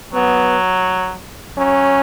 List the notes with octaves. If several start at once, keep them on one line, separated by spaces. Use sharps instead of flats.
F#3 B3
F#3 C#4